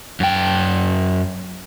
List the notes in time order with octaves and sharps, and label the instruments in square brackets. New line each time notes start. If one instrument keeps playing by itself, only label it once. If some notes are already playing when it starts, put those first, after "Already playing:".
[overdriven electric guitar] F#2 G5